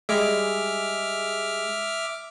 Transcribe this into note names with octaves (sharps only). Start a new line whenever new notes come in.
G3 G#3 G#4 E5 D6 F6